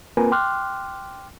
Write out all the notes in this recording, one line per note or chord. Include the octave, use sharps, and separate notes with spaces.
A#3 C4 F4 A#4 B4 G#5
G5 C6 D6 F6 F#6